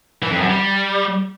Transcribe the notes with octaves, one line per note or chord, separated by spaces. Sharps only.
E3
F2
F#2
G3